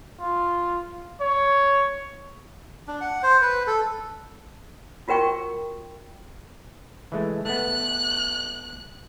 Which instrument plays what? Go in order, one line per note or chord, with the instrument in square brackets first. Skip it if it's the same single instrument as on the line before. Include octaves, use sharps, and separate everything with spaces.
[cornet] F4
C#5
[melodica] D4
F#5
C5
B4
A4
[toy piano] F4 F#4 A#4 G5 C#6
[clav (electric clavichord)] E3 G#3 A3
[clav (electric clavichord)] A3 B3 [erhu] F#6